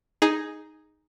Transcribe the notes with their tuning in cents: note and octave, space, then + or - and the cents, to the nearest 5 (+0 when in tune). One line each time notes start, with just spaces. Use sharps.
D#4 +0 G#4 +0